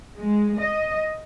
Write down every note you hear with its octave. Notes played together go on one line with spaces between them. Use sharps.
G#3
D#5